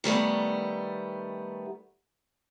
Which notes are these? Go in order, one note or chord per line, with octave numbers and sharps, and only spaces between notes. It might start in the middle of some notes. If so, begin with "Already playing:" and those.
D#3 G3 A3 B3